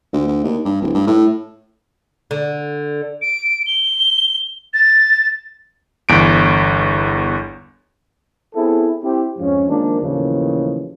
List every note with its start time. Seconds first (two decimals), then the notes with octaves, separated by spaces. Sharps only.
0.13 D2
0.28 D2
0.44 D#2
0.65 G2
0.82 D1
0.95 G2
1.07 A2
2.31 D3
3.22 D7
3.66 G7
4.74 A6
6.09 G1 E2 D7
8.55 B3 C4 E4 G#4 A4
9.03 C4 E4 G4
9.39 F2 G#2 F3 C#4
9.68 D#3 F3 G#3 A#3 D4
10.01 D#2 A2 C#3 E3 F3